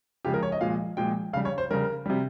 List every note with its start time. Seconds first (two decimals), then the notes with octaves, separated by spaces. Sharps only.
0.25 C#3 F3 G#3 G4
0.34 A#4
0.43 C#5
0.52 D#5
0.61 A#2 F3 G#3 F5
0.97 A#2 F3 G#3 G5
1.33 C#3 F5
1.37 G3
1.45 C#5
1.58 C5
1.70 C#3 G3 A#4
2.06 C3 G3